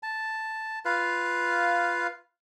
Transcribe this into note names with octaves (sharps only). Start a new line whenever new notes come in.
A5
F4 B4 F5